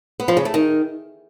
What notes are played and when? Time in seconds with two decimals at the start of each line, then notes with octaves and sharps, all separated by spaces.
0.20 B3
0.28 F3
0.37 C#3
0.45 A3
0.54 D#3